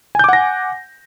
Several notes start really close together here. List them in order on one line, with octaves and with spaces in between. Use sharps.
G#5 G6 D6 F#5 A#6